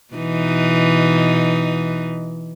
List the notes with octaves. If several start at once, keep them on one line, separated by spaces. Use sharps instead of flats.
B2 E3 D#4